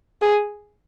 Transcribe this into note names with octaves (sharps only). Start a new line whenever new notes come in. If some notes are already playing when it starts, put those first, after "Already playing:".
G#4